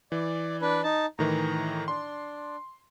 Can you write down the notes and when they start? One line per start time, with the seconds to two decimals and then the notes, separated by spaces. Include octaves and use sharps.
0.12 E3 D5
0.62 D4 B4
0.83 D#4 A5
1.19 A2 D#3 E3 A#5
1.88 D4 C6